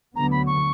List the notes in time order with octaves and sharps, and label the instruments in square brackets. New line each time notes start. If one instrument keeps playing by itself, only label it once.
[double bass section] D2 D3 F#3 B3 [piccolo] A#5
[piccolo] B5
C#6